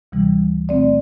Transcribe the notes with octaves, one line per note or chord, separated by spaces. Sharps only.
D2 C3 E3 G3
B2 A3 C4 D5